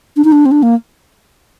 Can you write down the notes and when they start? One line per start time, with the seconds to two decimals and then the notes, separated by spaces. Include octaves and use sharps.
0.17 D4
0.24 D#4
0.32 D4
0.46 C4
0.51 D4
0.63 A#3